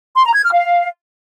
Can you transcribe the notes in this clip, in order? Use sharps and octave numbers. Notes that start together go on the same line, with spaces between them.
C6
A#5
G#6
F6
F5